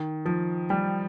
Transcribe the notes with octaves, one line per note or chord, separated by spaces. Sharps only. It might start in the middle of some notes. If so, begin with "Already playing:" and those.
Already playing: D#3
F3
G3